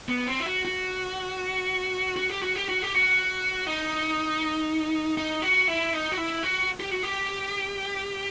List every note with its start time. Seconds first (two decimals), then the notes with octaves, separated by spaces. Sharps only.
0.09 B3
0.27 C4
0.40 E4
0.46 F#4
0.65 F#4
2.16 F#4
2.30 G4
2.42 F#4
2.56 G4
2.69 F#4
2.82 G4
2.94 F#4
3.67 D#4
5.17 D#4
5.42 F#4
5.68 E4
5.93 D#4
6.12 F#4
6.17 E4
6.43 F#4
6.80 G4
6.91 F#4
7.03 G4